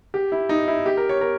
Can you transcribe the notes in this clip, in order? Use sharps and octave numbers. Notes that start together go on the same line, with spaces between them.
G4
E4
D#4
E4
G4
A#4
C#5
A#4